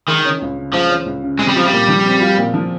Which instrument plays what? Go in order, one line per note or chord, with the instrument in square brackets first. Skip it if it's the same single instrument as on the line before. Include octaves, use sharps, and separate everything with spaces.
[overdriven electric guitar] D#3 [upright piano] G#3
[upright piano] C#4
C#2
C#3
[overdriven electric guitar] F3 [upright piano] G#3
[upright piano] C#4
C#2
C#3
[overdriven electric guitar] G#3 [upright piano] C4
[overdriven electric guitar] G3
[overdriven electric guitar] F3 [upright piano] F4
[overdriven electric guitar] G3
[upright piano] A#2
F3
C4
F4
A#2
F3